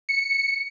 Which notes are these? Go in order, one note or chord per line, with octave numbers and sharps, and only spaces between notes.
C#7